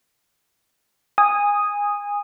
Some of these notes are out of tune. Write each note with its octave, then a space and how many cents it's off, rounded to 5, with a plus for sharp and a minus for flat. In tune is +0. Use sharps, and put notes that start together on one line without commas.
G#5 -20 D#6 +0